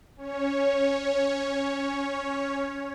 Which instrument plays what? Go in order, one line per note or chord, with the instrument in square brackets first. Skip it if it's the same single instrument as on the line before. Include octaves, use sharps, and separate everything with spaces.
[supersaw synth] C#4 C#5